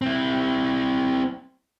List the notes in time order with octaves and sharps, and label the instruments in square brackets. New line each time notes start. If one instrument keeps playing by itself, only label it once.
[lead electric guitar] C4 E4